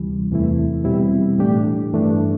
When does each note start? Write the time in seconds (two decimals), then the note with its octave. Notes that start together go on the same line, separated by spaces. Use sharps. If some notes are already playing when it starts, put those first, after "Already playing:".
Already playing: D2 C3 E3 G3
0.31 E2 C3 E3 A3 E4
0.84 B2 G3 C4 E4 G4
1.38 A2 E3 A3 D4 G4
1.93 G2 E3 A3 D4